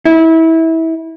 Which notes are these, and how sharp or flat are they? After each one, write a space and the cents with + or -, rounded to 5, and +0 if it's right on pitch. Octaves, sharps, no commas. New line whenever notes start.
E4 -25